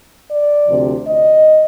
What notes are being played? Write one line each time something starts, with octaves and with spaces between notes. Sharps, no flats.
D5
D2 C3 F3
D#5